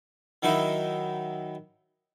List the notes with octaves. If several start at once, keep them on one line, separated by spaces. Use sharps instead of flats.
D#3 F#3 D#4 E4